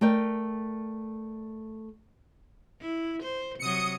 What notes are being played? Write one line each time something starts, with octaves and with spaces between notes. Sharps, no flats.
A3 A#4 D5 G5
E4
C5
C3 F#3 D#6 C#7